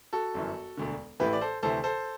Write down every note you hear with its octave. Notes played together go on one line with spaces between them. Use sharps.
F#4 A4
G1 F#2 E3
E1 D2 D3
A1 A2 E3 G4 B4
D5
A4 C5
D2 C3 E3 A4 C5
A4 C5